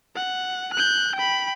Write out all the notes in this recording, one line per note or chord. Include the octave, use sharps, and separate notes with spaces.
F#5
F#6 G6
G5 B5